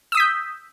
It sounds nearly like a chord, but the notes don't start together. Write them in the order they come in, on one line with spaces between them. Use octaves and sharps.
E6 D#6 B6 G6